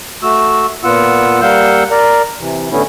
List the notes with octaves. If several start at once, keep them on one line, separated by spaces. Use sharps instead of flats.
A3 F#4 E6
A#2 B3 F4 F#5 E6
G3 A#3 F5 F#5 E6 G6
A#4 D5 A#5
C3 E3
A2 D3 A3 B3 C#4 E4